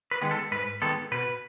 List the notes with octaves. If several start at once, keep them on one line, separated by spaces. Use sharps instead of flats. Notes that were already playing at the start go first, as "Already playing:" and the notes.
B4
D#3 G#3 B3
A4
G#2 B4
D#3 G#3 B3 A4
B2 B4